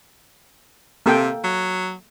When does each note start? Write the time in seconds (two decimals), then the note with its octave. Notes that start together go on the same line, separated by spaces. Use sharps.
1.06 C3 A#3 A4 G5
1.44 F#3